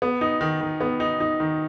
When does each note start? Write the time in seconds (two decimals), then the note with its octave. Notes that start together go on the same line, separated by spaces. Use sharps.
0.02 B3
0.21 D#4
0.41 D#3
0.61 D#3
0.81 B3
1.00 D#4
1.20 D#4
1.40 D#3